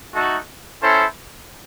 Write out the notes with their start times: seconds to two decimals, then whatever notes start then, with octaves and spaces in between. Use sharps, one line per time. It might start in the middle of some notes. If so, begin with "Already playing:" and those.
0.14 A3 D#4 F#4 A4
0.81 C#4 E4 A4 C5